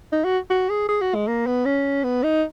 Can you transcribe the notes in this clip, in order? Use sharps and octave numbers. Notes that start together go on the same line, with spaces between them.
D#4
F#4
F#4
G#4
G#4
F#4
G#3
A#3
B3
C#4
B3
D#4